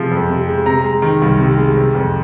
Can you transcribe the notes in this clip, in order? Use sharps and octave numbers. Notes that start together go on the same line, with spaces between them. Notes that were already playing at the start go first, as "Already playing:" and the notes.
Already playing: C3 F3 G#3
F2
C3
G#3
C3 A#5
G#3
D#3
C2
C3
G#3
C3
F2